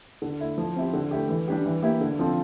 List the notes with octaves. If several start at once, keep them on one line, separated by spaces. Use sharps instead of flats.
D3
A3 E4
F3
C4 E4 G4
D3
A3 E4 G4
E3
G3 D4 G4
E3
A#3 E4 G4
D3
F3 C4 F4 A4